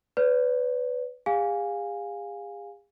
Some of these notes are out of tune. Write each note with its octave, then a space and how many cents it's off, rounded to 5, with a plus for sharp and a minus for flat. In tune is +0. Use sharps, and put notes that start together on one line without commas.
B4 +15 D5 -45
G#4 -40 F5 +15 G#5 -15